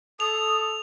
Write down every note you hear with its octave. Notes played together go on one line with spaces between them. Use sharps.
A4 D#6 F7